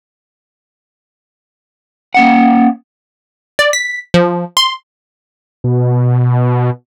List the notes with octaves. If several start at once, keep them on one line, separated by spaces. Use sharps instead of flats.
A#3 C#4 F#5
D5
B6
F3
C6
B2